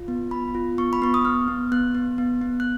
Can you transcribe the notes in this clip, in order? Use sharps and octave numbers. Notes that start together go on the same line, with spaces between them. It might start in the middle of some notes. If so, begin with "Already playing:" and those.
Already playing: F4
B3
B3 B5
F4
B3 C#6
B5
B3 C#6
D#6
B3 F6
B3
B3 F#6
B3
B3
B3
F#6